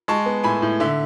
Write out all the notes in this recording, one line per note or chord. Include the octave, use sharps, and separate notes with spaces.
G#3 A5 C#6
B3
A2 G#5 B5
A2
D3 E5